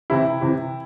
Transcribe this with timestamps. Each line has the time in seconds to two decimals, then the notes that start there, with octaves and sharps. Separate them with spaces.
0.10 C3 E3 E4
0.41 C3 E3